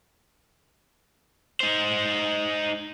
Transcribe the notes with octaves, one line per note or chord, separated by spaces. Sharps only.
D#4 C5